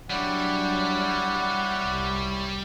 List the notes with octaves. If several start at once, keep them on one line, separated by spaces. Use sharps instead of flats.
F#3 G3 D4 E4 C#5 D5 F#5
C2